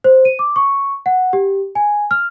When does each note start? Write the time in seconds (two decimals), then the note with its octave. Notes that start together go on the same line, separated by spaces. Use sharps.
0.04 C5
0.25 D#7
0.39 D6
0.56 C#6
1.06 F#5
1.33 G4
1.75 G#5
2.11 F6